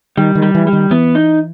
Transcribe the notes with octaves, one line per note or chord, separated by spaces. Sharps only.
D#3 G3
D#3
G3
E3
G3
D#3
E3 B3
D#4